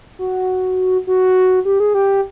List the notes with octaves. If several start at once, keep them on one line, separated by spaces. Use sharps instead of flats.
F#4
F#4
G4
G#4
G4